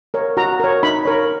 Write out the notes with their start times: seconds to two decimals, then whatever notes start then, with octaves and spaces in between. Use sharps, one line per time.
0.14 A#4 C#5
0.37 F#4 A#5
0.60 A#4 C#5
0.83 D#4 B5
1.05 A#4 C#5